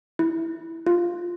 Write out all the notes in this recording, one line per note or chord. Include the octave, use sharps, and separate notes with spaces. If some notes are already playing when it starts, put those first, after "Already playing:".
E4
F4